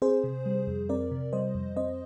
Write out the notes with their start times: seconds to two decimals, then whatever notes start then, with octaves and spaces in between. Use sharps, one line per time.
0.02 C4 G#4 C5
0.24 C3
0.46 G3
0.67 F2
0.89 C4 A#4 D5
1.11 C3
1.33 G3 C5 D#5
1.55 F2
1.76 C4 C5 D#5